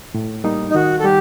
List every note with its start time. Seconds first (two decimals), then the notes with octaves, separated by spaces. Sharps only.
0.14 A2
0.44 G3 A#3 D#4
0.70 D#4
0.75 D#3 F#4
1.00 A4
1.04 G3 G4